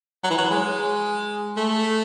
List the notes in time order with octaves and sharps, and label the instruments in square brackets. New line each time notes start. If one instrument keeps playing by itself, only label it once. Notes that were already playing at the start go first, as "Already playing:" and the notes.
[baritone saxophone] F#3
E3
F#3
G#3
A3